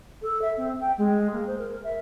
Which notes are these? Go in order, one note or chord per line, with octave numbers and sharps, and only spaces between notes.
A4
E5
C4
G5
G#3
A#3
C5
A#4
E5